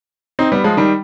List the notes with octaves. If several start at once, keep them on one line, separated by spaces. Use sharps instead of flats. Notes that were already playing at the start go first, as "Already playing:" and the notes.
C4 D#4
G3 B3
F3 G#3
D#3 G3